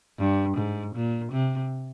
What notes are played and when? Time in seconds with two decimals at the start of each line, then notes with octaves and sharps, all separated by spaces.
0.19 G2
0.57 G#2
0.95 A#2
1.32 C3